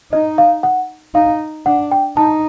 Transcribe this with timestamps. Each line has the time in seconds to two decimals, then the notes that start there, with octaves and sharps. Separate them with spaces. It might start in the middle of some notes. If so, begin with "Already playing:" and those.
0.12 D#4 D#5
0.38 F5
0.63 F#5
1.15 D#4 F5
1.66 D4 F#5
1.91 G5
2.17 D#4 A5